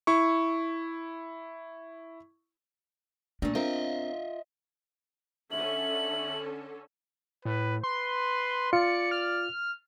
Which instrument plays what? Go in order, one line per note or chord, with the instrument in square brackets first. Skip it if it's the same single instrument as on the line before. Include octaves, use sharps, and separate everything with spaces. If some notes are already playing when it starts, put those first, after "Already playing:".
[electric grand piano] E4 C#6
[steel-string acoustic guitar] A#2 A3 [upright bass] D4
[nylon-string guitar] C4 A#4 [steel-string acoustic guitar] F4 [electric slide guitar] D#5 E5
[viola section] D3 C#4 A4 [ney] E5 [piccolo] F#7
[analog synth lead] A2 [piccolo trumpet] B4
[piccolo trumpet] B4 [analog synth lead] C6
[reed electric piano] F4 [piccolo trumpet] D5 [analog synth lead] C#7
[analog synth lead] F6